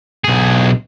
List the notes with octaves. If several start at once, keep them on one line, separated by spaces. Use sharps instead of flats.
B1 G#4